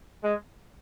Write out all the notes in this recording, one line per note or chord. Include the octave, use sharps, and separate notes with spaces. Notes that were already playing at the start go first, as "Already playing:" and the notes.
G#3